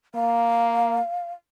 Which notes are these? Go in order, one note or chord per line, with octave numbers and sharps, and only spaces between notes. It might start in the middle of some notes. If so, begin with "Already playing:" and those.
A#3 F5